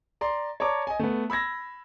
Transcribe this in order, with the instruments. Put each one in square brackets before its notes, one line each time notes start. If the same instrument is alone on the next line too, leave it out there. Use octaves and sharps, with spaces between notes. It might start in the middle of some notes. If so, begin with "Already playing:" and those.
[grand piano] D5 A#5 C6
C#5 D5 A5 A#5 D6
D#5 G#5
A3 B3
B5 E6 G#6 A#6